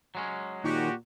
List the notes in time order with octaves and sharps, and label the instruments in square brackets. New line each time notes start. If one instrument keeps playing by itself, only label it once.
[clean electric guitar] F#3 G#3 C#4
[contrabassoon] A#2 [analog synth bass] D#3 [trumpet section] F#4 G4